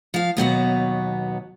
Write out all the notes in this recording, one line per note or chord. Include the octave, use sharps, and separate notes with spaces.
F3 F5
D#2 B2 F#3 B3